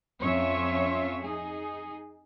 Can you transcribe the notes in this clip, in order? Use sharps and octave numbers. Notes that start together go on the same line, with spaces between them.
F2 C#4 F4 C#5 E5
D#4 G#4